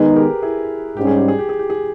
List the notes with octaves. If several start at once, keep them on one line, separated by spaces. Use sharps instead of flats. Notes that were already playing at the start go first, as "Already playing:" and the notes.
Already playing: D#3 G#3 B3 D#4 G#4 B4
G4 A#4
E4 G#4
G#2 G3 C#4 G4
G#4
G4
G#4
G4
G#4
G4
G#4